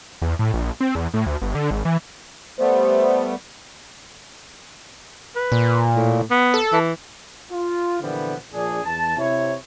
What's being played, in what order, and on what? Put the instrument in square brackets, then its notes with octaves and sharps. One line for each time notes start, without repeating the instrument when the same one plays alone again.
[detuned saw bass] E2
A2
A#1
C4
E2
A2
D2
G1
D3
G#1
E3
[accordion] G3 A3 B3 [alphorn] C5
[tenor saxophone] B4
[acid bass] A#2
[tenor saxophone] A2
B3
[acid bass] A4
[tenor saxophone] E3
[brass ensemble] F4
A#2 D3 E3 F3 G3 B3
A#1 D4 G#4
E2 A5
C3 E4 C#5